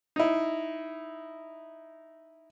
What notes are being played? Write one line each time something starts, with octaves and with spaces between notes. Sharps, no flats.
D#4 E4